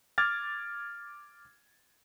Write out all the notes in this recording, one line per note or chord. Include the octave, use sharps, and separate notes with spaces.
D6 F6 G#6 A6